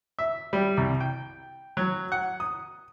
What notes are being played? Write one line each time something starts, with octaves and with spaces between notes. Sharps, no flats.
E5
G3
C2
G5
F#3
F#5
D#6